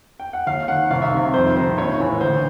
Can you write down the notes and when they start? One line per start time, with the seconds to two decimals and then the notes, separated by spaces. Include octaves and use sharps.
0.20 G5
0.33 F#5
0.47 D#2 F5
0.68 D#3 F#5
0.90 C2 F5
1.02 E5
1.13 C3 D#3
1.34 F2 C5
1.56 C3 D#3 C5
1.78 A#1 C#5
2.00 A2 E3
2.21 D2 C5